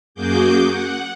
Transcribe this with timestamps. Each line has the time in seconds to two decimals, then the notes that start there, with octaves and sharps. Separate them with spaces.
0.14 F#2 A#3 F#4 G#4 D6 G6
0.67 F#5